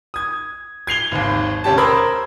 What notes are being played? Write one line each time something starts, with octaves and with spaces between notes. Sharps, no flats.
D#6 G#6
G#6 C7 F7 G7
G#1 D#2
D2 C#4 G4 A5
A#4 C5 B5 D#6 E6 G#6